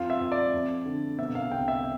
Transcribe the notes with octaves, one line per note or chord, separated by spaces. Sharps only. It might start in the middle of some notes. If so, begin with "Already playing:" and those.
Already playing: F2 F4
E5
F2
D5
F2
D3
B2 E5
F5
C2 G5
E5